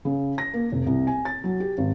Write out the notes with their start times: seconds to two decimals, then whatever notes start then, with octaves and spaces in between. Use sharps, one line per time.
0.05 C#3
0.38 A#6
0.54 A#3
0.72 F1
0.86 C2
1.07 G#5
1.25 A6
1.44 F#3
1.60 G4
1.78 G#1